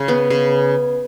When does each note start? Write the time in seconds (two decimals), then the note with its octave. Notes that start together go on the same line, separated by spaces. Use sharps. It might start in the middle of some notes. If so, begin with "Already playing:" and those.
Already playing: C#3
0.08 B3
0.30 C#3